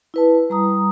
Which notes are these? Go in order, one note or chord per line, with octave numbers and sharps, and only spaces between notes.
E4 B4 A5
G3 A#5 D#6